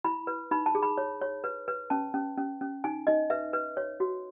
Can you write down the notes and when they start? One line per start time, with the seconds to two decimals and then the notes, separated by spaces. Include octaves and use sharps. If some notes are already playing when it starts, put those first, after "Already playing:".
0.05 E4 B5
0.27 B4
0.51 D#4 B5
0.66 A5
0.75 G#4
0.82 B5
0.98 C#5
1.22 C#5
1.44 B4
1.68 B4
1.90 C#4 A5
2.14 C#4
2.38 C#4
2.61 C#4
2.84 D#4 G#5
3.07 D#4 D#5
3.30 B4 E5
3.53 B4
3.77 C#5
4.00 F#4